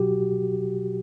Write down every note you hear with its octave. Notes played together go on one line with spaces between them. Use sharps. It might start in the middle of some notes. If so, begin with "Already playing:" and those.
Already playing: B2 F#3 F#4 G4